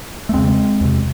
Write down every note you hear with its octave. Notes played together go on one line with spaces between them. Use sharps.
A3
E2 C#3 G#3 C4
E2 C3